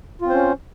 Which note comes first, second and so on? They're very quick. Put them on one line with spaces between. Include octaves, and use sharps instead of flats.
F4 C4 C5 C#4